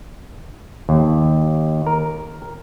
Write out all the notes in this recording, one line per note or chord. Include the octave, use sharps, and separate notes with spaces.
D#2
A#4